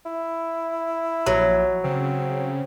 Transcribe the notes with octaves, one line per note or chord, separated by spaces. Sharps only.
E4
A#1 F#3
C#3 C4